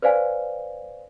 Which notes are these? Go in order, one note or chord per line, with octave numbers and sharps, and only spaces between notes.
B4 C5 D5 F5 G#5